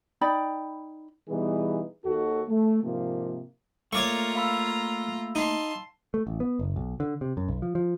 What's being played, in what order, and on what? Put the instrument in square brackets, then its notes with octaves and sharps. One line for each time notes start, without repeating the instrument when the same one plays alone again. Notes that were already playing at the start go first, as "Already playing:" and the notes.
[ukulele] D#4 D5 G5 B5
[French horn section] B2 E3 G3 B3 D#4 G#4
D#2 F#4 A4
A3
G#2 C3 F3 A#3
[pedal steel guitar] A3 A#3 [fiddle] F4 A#5 [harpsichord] C#5 D5 C#6
[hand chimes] F5 B5 E6
[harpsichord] D#4 [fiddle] A5 C6
[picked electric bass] A3
A1
B3
F#1
B1
D3
C3
F#2
B1
F3
F3